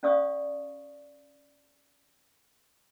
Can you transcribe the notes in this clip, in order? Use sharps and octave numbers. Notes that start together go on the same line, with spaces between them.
C#4 D5 F5 C#6 D#6